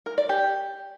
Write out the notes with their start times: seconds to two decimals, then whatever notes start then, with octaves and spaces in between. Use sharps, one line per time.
0.06 A#4
0.18 D5
0.29 G4